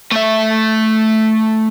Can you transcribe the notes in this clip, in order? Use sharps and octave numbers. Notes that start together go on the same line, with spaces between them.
A3 E5